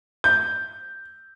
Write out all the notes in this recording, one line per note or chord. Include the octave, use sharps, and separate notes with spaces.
G6